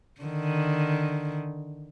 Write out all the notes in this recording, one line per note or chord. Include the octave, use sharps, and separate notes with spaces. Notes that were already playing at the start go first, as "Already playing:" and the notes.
D3 D#3